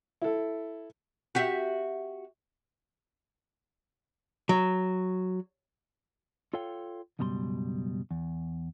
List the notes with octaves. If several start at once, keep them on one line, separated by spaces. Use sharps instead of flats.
E4 A4
F#4 G4 E5
F#3
F4 A4 C#5 F5 G5
C#2 F#2 B2 G3 A#5 C6
E2